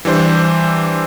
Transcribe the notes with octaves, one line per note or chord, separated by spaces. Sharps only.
E3 G3 D4 C5